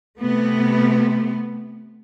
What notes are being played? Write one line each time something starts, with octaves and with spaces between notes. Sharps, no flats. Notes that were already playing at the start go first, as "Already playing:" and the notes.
C3 A3 B3